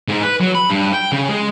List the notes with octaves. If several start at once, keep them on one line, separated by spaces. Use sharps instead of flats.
G#2
B4
F#3
B5
G2
G5
C#3
G#3